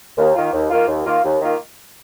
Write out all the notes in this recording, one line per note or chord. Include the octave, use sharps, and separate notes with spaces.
D#2
D#3 A#3 F4
D#2
D#3 A#3 F4
D#2
D#3 A#3 F4
D#2
D#3 A#3 F4